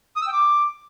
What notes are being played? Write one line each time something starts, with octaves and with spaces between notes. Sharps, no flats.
D#6
E6
G5
D6